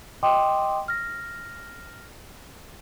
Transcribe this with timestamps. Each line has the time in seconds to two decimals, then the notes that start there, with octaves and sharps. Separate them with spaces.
0.23 D#5 G5 C6 D6 D#6
0.88 F6 A#6